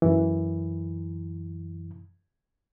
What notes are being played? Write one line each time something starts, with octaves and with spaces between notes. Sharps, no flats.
F#2 E3